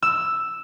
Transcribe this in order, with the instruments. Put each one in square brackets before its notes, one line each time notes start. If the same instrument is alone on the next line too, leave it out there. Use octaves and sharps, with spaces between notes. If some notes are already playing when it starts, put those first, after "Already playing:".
[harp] E6